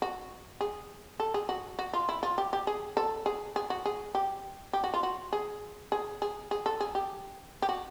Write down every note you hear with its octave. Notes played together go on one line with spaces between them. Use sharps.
F#4
G#4
A4
G#4
F#4
F#4
F4
E4
F4
G4
G4
G#4
A4
G#4
G#4
F#4
G#4
G4
G4
F#4
F4
F#4
G#4
G#4
G#4
G#4
A4
G#4
G4
G4
F#4